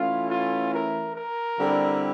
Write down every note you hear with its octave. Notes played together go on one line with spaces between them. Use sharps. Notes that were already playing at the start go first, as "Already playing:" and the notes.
Already playing: E3 A3 C#4 E4 F4
F4
A#4
A#4
D3 G3 C4 E4